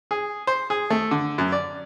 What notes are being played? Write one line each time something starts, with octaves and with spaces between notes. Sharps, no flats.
G#4
C5
G#4
A3
D3
F#2
D5